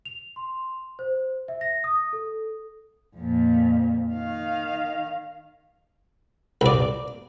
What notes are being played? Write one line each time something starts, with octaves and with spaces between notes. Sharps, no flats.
F7
C6
C5
E5
A#6
D#6
A4
F2 A#2
D#3 F5
C2 D5